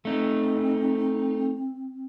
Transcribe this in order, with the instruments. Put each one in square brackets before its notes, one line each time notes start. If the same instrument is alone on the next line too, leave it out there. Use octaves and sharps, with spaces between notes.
[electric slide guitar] A3 D#4 [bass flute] C4